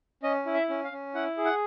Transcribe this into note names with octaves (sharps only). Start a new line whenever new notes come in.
C#4 D#5
E4
E5
C#4
F5
C#4
E4 F#5
G#4
F#5